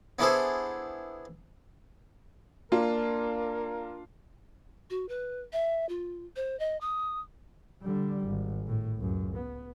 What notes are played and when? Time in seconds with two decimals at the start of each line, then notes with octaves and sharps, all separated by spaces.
0.19 B3 D4 E4 G#4 A4 C5
2.72 A#3 D4 F4 A#4
4.90 F#4
5.08 B4
5.53 E5
5.89 F4
6.36 C5
6.59 D#5
6.81 D#6
7.82 D3 G3
8.27 G#1
8.67 A2
8.98 C#2 F#2
9.36 B3